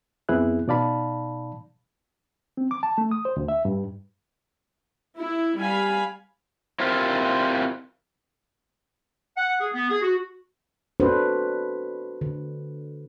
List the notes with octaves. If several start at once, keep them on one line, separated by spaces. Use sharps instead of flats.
F2 B3 C4 E4 G#4 F#6
B2 D#4 D5 F5 A5 B5
C4
D6
A5
A3
D#6
C5
D2
E5
G2
E4
G3 F5 G#5 B5
C4 E4 F4 G4 A#4 C5
F#5
G#4
B3
G#4
F#4
D4 F#4 A4 B4 C5
D3